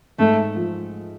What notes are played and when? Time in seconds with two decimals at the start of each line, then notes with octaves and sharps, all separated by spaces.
0.19 G#2 A3
0.55 F3